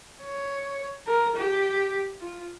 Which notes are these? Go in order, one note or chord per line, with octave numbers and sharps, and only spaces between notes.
C#5
A#4
G4
F4